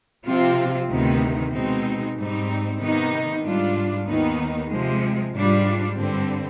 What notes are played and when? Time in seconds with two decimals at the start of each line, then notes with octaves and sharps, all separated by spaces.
0.26 C3 F3 C4 F4
0.89 D2 C3 D#3 B3 D#4
1.53 B2 G#3 C4 D#4
2.16 G#2 G3 C4 D#4
2.79 C3 D#3 B3 D#4
3.43 G#2 G3 D4 F4
4.06 D#2 D#3 B3 D#4
4.70 C3 F3 G#3
5.33 G#2 G3 D4 F4
5.97 G2 D3 G3 C4